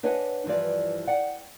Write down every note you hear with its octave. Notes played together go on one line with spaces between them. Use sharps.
D4 B4 C#5 D#5 F#5 G#5
G2 E3 F3 D5
D5 F#5 G5